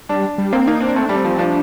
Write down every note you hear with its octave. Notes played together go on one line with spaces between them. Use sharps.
G3 D4
G3
A#3 C4
A#3 D#4
C4 D4
A3 C4
G3 D4
C4
F3
F3 D4